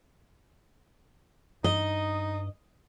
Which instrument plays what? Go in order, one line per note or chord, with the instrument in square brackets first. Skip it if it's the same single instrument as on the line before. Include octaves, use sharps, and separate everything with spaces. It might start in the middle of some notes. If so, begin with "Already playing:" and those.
[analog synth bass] G2 [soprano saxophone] D#4 [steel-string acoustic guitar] D#5